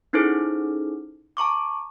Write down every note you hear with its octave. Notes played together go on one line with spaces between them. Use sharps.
C#4 D#4 E4 G#4 A4 C5
A5 A#5 C#6 D6